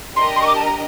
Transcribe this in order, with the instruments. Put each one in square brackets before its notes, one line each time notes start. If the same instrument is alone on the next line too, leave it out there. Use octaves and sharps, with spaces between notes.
[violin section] D4 G4 A#4 D#5 [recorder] C6
[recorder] C6
C#6
D6
A5
A#5